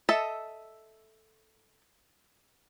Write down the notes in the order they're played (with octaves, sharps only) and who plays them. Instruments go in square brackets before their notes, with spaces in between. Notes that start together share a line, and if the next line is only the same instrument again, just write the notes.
[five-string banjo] A4 D#5 E5 A5